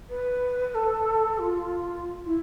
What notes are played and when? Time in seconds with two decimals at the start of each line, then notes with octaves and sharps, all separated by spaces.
0.10 B4
0.75 A4
1.39 F4
2.26 E4